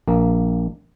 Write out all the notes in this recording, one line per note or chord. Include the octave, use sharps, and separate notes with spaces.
A#1 A#3